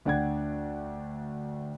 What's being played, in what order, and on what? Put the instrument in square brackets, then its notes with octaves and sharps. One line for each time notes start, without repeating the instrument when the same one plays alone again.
[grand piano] D2 D4 D5 F#5 G5 G#6